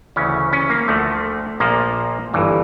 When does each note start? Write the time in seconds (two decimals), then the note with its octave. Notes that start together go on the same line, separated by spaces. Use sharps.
0.16 D2 C#3 E3 C#4
0.53 C#4
0.70 A#3
0.88 D2 D3 F3 A3
1.60 A#1 A#2 F3 A#3
2.34 G1 G2 E3